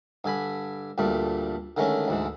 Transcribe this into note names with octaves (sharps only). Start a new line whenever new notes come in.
G2 D3 G#5 B5
D2 G2 A#2 G3 A3
D3 D#3 G#3 A3 C#4
D2 G#2 E3